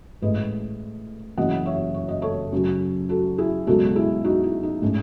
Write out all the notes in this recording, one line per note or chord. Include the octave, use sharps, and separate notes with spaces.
A1 A2 G#3 B4 D#5
F#1 F#2 E3 D#5 F#5
C#5 E5
C#5
D#5
A4 C#5
F#2 C#3 F#3
F#4 A4
E4 G#4
C#2 B2 F#3 F#4 A4
E4 G#4
D#4 F#4
E4
D#4
A2 G#3 C#4